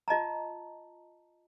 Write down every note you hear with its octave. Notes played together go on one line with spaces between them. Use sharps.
F4 D#5 A5 A#5